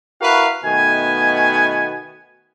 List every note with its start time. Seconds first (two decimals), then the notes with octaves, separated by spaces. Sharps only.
0.20 E4 F#4 A#4 B4 F5
0.64 B2 D#3 A3 B3 G#5